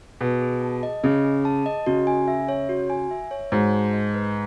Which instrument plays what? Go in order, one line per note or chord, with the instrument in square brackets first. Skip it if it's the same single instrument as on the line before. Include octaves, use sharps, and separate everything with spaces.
[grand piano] B2 [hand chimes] G#4
[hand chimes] G#4
A5
D#5
[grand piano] C#3 [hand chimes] G#4
[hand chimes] G#4
A5
D#5
[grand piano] C#3 [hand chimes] F#4
[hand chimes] G#5
E5
C#5
F#4
G#5
E5
C#5
[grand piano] G#2 [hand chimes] F#4
[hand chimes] A5
D#5
B4